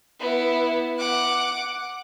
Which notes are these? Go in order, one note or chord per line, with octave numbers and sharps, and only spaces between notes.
B3 E4
F#5 D6